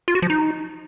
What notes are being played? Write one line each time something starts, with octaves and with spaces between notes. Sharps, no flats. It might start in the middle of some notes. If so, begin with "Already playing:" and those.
F4
F#4
F3
D#4